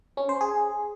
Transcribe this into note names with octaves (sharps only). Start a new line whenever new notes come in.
C#4
C5
G#4